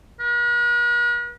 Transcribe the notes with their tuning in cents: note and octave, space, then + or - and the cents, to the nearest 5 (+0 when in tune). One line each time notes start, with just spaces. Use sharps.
B4 -45